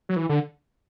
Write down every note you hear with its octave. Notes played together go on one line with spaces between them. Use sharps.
F#3
E3
D3